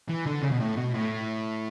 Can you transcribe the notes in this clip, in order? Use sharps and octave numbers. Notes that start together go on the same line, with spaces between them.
E3
D3
C#3
B2
A2
B2
A2